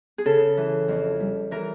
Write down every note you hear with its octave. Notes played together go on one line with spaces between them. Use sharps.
G#4
C#3 A4
E3
F2
G3
E3 A#4